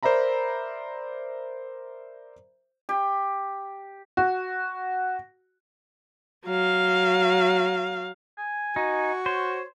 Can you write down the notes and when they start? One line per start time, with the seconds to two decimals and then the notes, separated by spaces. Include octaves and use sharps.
0.03 A#4 C5 D5 E5 A#5 B5
2.89 G4
4.17 F#4
6.46 F#3 F5
8.38 G#5
8.76 D#4 F#4
9.26 C5 C#5